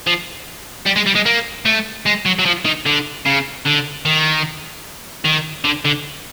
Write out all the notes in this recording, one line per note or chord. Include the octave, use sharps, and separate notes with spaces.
F3
G3
G#3
G3
G#3
A#3
A3
G#3
F#3
F#3
F3
D#3
D3
C#3
D3
D#3
D#3
D3
D3